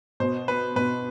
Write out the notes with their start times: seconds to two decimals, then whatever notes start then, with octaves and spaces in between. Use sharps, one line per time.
0.20 B2 C5
0.48 B3 B4
0.76 B2 B4